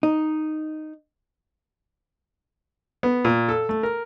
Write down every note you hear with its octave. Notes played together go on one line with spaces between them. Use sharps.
D#4
B3
A#2
A4
A3
A#4